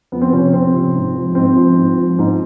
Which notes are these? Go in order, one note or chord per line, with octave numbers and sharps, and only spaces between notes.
F2 B3
C4
C3 F3 C#4
C4
F2 C4
C3 F3
G#2
F3
G#2 C4
F3
G#2
F3
G#2